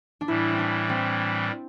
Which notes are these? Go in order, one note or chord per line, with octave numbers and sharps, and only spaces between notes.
D4
A2 E3 G3 E4
C4
D4
C4